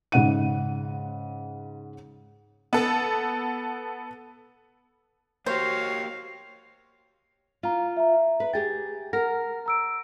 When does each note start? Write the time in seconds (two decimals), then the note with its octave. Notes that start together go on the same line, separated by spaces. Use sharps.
0.12 G#2 C#3 F#5 D#7
2.73 B3 A4
5.46 A#3 F#4 G4 C5 C#5 F5
7.63 F4 F5 A#5
7.97 E5 A#5
8.40 B4
8.53 G4 G#4 G5 A6
9.13 A#4 F#5 F6 A#6
9.66 A#5 E6 D7